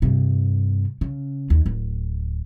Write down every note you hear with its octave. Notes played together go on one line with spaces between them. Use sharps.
G2 C3
C#3
D#2
D1